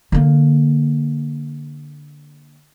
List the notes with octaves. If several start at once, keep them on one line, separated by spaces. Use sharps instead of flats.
D3 A#3